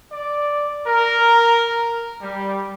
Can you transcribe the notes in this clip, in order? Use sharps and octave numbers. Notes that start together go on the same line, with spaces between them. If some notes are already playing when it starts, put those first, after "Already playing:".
D5
A#4
G3